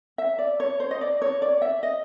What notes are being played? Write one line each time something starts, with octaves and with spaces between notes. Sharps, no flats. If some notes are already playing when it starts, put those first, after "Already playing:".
E5
D5
C#5
C5
D#5
D5
C#5
D5
E5
D#5